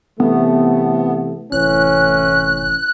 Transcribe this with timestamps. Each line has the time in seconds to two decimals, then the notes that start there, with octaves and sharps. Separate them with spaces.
0.20 C3 E3 A3 B3
1.52 F1 A2 E3 C#4 F#6